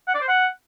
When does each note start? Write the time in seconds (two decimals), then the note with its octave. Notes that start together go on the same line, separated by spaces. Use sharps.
0.08 F#5
0.14 D5
0.21 C5
0.28 F#5